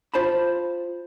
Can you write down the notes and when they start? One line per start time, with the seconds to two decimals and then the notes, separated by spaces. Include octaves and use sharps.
0.14 F4 C5 A5 B5